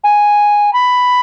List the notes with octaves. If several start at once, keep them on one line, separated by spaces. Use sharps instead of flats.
G#5
B5